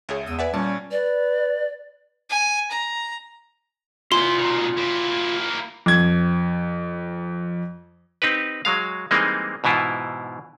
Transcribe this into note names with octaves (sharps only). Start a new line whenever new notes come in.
C#2 G#4 C#5 E5
E2 D#6 E6 D#7
B4 D5 E5 F#5 G#5
A#2 G3 C#4 A5
B4 D5
G#5
A#5
B3 E4 F4 G#5 C6
B2 D#3
A#3 E4
F2 G#6
C4 D#4 G4 B4
F#3 G#3 F5
E3 G3 G#3 A#3 C4 D#4
G#2 B2 E3 E4 F4